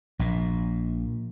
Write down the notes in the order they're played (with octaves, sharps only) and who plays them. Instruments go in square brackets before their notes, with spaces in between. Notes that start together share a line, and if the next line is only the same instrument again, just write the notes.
[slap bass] A#1 A#2